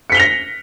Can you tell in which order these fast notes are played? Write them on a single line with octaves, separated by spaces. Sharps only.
C#7 B6 G7 F7 A#6